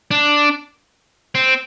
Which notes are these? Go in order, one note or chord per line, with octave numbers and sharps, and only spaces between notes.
D4
C4